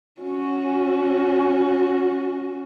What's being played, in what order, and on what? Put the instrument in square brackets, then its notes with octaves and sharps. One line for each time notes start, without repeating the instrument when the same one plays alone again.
[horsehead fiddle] C#4 F#4